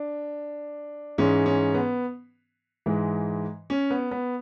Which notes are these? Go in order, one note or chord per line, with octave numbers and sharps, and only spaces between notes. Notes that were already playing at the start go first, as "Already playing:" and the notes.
Already playing: D4
G#2 E3 G#3 C#4
C#4
B3
G#2 E3 G#3
C#4
B3
B3